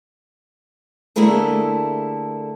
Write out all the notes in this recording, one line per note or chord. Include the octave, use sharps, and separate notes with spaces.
D3 A3 A#3 E4 G#4 A4